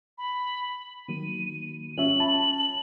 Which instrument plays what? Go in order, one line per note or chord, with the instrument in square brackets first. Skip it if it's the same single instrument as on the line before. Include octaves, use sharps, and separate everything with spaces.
[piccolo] B5
[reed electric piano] D#3 F#3 A#3 [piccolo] D#7
[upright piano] C#4 [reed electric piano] F4 E5 [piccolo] F#7
[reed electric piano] A5 B5